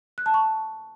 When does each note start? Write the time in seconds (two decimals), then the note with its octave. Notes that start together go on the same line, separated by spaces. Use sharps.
0.18 F#6
0.26 A5
0.34 C#6